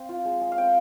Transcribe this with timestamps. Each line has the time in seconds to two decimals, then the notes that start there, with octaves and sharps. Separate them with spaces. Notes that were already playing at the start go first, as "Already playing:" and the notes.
Already playing: C4 F5
0.09 F4
0.25 G#3
0.41 G#3
0.52 F5
0.58 C4 G5